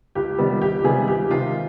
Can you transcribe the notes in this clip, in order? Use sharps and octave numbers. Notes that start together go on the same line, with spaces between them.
C#2 G4
C3 D#3 G3 B3
C#2 G4
C3 D#3 G3 B3 G#4
C#2 G4
C3 D#3 G#3 F4